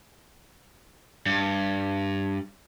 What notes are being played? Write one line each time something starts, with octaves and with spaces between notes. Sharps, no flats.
G2